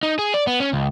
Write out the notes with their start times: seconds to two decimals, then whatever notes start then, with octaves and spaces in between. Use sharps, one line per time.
0.03 D#4
0.19 G#4
0.34 D5
0.47 B3
0.60 C#4
0.73 C#2